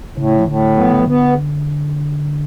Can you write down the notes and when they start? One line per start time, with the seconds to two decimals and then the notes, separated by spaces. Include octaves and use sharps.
0.17 A2 C#3
0.38 F3
0.48 A2 D3
0.77 F#3 B3
0.85 F3
0.92 D3
1.00 F3
1.07 D3 B3